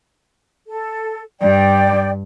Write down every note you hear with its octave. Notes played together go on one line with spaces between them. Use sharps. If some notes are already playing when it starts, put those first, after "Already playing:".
A4
G2 D5 G5